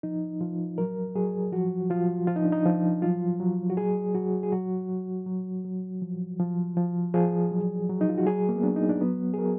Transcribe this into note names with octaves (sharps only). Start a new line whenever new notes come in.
F3 D#4
F3 F4
F#3 A#4
F#3 G#4
F3 F#4
F3 F4
F3 F4
D#4
D4
D#4
F3
F#3 F4
F#3
F#4
F#3 G#4
F#3 F#4
G#4
F#3 F#4
F#3
F#3
F#3
F3
F3
F3
F3 G#4
F#3
F#3
D#4
F4
F#4
F#3 G#4
A#3
B3
F#3 D4
D#4
D4
F#3 B3
G#4
F#3 A#4